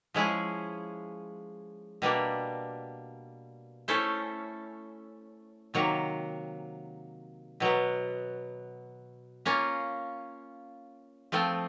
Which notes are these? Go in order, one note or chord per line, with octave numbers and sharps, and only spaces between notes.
F3 G#3 C#4 E4 G#4
B2 G3 A#3 D4
A3 C#4 E4 A4 C5
C3 D#3 F#3 A#3
B2 F#3 B3
A#3 C#4 F4
F3 A3 C4 F4